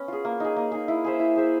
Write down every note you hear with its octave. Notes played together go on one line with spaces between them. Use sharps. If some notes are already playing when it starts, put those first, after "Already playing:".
Already playing: B3 C#4
F4 G#4
A#3
D#4 G#4
A#3
D#4 G#4
E4
G#4 C5 E5
E4
G#4 C5 E5